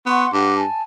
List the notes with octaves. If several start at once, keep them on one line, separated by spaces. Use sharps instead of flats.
B3 F#5 C6 C#6
G2 F#5 D6
G#5 A5